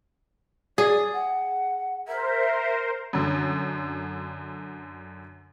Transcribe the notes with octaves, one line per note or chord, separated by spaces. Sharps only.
G#4 D5
F#5
A#4 C5 E5
F#2 D3